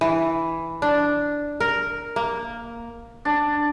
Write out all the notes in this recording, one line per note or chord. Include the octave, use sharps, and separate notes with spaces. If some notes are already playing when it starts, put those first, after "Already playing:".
E3
D4
A#4
A#3
D4